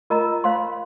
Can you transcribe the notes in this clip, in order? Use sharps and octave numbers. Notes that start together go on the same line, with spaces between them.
F4 A#4 D#5 A#5
C5 F5 C6